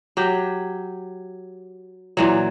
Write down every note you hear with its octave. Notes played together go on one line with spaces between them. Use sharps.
F#3 G4
A#2 E3 F#3